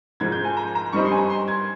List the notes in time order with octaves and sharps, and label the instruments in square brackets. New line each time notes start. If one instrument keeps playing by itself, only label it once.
[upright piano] G#2 F3 G#3 G#6
G6
G#5
A#5
A#5
G2 G3 C4 D#4 C#6
C6
G#5
A#5
C6
G#6